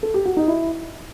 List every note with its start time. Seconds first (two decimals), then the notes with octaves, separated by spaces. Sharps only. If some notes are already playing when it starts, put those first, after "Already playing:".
0.03 A4
0.14 G4
0.25 F#4
0.37 D#4
0.48 E4